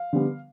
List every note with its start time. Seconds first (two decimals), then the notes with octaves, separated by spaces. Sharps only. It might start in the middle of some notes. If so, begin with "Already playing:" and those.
Already playing: F5
0.13 D3 G3 B3